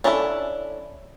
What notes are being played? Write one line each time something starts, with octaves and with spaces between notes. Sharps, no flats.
C#4 D4 E4 G#4 A4